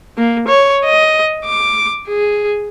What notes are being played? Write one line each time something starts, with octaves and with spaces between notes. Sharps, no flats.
A#3
C#5
D#5
D6
G#4